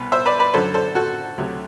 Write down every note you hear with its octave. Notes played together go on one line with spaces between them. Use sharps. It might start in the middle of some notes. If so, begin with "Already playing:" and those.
Already playing: C2 B2 B4
C5 E5
B4 D5
B4 D5
F#2 D3 F#3 A4 C5
A4 C5
F#4 A4
D2 C3 F#3